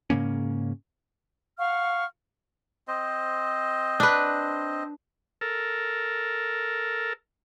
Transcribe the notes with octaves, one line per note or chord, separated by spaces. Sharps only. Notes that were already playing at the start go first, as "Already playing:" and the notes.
G#2 C#3 A#3 C#4
F5 F#5 C#6 F6
C4 C5 D#5
D4 B4
A4 A#4